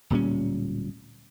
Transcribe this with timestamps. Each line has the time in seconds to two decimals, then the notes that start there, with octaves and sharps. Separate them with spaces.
0.10 D1 A#2 G3 C#4